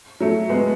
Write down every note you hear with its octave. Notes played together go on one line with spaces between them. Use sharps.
F#3 A3
G#3 B3